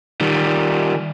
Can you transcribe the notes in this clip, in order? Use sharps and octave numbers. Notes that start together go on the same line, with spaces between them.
D#3 G3